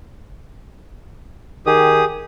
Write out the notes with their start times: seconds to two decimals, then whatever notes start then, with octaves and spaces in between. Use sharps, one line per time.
1.66 D#3 G4 G#4 D#6